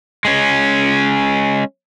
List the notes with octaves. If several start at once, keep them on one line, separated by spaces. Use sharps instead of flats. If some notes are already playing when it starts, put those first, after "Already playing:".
G#3 C#4